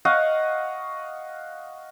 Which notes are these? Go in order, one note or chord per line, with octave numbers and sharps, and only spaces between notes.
D#5 F5 F#5 C#6